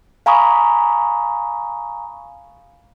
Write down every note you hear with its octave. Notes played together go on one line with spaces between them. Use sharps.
F5 G#5 A#5 B5 C#6 D#6